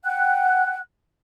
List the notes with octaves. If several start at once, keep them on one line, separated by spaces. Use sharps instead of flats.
F#5 G5 F#6